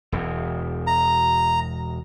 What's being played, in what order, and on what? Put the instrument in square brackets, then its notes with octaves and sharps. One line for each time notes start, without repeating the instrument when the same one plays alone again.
[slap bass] E1 E2
[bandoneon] A#5